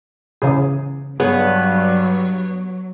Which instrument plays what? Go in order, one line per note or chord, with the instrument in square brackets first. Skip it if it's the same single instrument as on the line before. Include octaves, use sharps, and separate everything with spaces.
[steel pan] C#3 E3 G#4
[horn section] G2 [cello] F#3 [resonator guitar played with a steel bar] B3 C#5 [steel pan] G#4